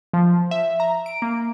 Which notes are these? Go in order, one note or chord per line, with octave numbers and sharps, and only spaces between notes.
F3
E5
A#5
D7
A#3